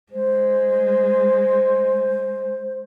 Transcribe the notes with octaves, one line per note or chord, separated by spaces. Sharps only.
G#3 C5